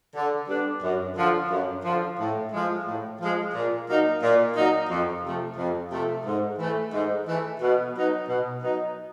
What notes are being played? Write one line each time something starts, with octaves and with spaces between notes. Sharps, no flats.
D3
G3 B3 D4
F#2
D3 F3
F#2
D3 F3
A2
F3 G#3
A2
F3 G#3
A#2
F#3 A#3 D#4
A#2
F#3 A#3 D#4
F2
C3 F3 A3
F2
C3 F3 A3
G#2
E3 A3
G#2
E3 A3
B2
F#3 B3 D#4
B2
F#3 B3 D#4